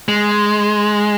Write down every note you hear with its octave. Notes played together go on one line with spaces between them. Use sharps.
G#3